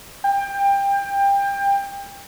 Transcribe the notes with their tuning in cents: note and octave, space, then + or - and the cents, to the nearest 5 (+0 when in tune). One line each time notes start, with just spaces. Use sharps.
G5 +25